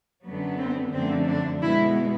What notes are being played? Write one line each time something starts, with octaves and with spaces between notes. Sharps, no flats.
F#2 D3 F#3 B3
C4
F#2 D3 F3 A3 C4
D4
B2 G#3 B3 E4